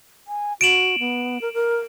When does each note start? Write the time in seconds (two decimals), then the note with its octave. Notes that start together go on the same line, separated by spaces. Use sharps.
0.27 G#5
0.61 F#4 D7 E7 F#7
0.99 B3
1.41 A#4
1.54 A#4